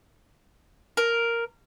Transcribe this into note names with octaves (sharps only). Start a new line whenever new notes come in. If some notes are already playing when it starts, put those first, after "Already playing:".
A#4